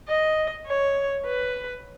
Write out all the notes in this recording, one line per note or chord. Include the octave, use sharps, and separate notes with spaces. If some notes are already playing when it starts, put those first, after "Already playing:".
D#5
C#5
B4